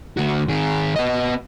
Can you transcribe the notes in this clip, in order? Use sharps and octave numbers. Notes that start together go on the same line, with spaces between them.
D2 F#4
D#3 G#4
B3 D#5